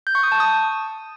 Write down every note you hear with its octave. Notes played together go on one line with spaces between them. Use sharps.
G6
C#6
D#6
A5
D#6